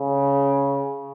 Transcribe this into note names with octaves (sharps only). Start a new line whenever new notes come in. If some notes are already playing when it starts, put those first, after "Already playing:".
Already playing: C#3